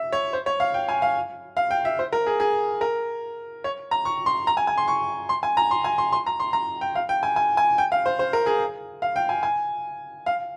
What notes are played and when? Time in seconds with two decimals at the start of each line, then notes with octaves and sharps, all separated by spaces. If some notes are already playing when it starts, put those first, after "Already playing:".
Already playing: E5
0.12 C#5
0.33 C5
0.46 C#5
0.60 F5
0.74 G5
0.89 G#5
1.02 F5
1.57 F5
1.71 G5
1.85 E5
1.99 C5
2.12 A#4
2.26 G#4
2.40 G#4
2.81 A#4
3.64 C#5
3.91 A#5
4.05 C#6
4.26 C6
4.47 A#5
4.57 G#5
4.67 G#5
4.78 C6
4.88 C#6
5.29 C6
5.43 G#5
5.57 A#5
5.71 C6
5.84 G#5
5.98 C6
6.12 C6
6.26 A#5
6.40 C6
6.53 A#5
6.81 G5
6.95 F5
7.09 G5
7.23 G#5
7.36 G#5
7.57 G#5
7.78 G5
7.92 F5
8.06 C5
8.19 C5
8.33 A#4
8.46 G#4
9.02 F5
9.16 G5
9.29 G#5
9.43 G#5
10.26 F5